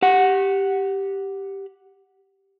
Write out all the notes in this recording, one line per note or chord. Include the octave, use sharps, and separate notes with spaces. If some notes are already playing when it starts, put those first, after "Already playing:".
G4 F#5